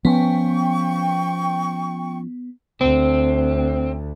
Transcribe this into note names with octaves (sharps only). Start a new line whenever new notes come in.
F3 B3 C#4 G5 C#6
D2 C4